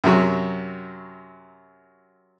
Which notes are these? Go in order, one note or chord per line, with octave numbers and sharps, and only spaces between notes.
F#2 C3 F#3 F#4